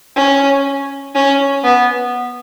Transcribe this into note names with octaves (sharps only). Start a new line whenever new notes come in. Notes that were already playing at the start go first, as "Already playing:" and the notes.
C#4
C#4
B3